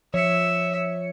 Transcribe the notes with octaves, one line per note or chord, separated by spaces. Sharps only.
F3 C#5 E5 C#7